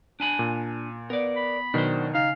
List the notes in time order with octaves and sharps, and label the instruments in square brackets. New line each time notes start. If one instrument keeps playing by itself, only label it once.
[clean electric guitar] D4 G#5 B5
[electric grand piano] A#2
[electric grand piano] B3 [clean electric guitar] A#4 D5
[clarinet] B5
[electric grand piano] B2 D#3 F#3 [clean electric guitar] D4 C5
[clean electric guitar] C#3 [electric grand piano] D#4 [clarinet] F5